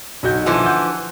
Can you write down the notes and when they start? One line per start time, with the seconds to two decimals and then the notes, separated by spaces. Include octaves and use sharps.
0.23 B1 F#4 G6
0.46 D3 E3 F3
0.66 F#5 G6